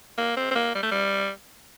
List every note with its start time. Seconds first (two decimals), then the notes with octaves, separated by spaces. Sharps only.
0.18 A#3
0.37 C4
0.51 C4
0.55 A#3
0.75 G3
0.83 A3
0.91 G3